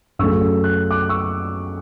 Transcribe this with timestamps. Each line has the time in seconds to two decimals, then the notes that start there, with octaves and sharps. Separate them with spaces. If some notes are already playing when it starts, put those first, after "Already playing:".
0.19 F#2 C#3 F#3 A3 C#6 E6
0.64 F#6
0.91 D6 F#6
1.09 C#6 E6